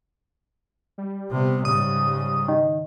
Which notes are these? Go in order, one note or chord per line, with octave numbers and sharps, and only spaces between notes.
G3
C3 B3
G#2 C#3 D#6
D#3